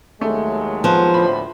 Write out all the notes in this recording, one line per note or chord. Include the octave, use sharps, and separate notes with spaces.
D#2 F#3 G#3 A3
F3 B3 C5
D2 A2 B5